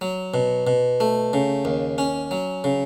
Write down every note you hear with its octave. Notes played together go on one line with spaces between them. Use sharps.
F#3
B2
B2
A3
C#3
D#2
C#4
F#3
C#3